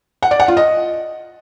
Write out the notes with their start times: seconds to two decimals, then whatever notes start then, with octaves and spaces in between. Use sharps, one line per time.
0.22 F#5
0.31 D5
0.40 F#5
0.48 F4
0.57 D#5